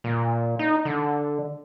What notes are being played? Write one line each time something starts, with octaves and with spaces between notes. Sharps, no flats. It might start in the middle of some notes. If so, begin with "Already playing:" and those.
A#2
D#4
D3